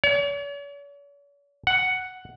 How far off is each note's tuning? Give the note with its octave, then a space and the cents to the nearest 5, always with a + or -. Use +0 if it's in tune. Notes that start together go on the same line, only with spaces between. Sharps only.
C#5 +45
F#5 +5